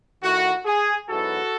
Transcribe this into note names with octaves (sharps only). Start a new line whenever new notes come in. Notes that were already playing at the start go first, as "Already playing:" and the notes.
D#3 A3 E4 F#4
G#4
G#2 F#3 B3 E4 F#4 A4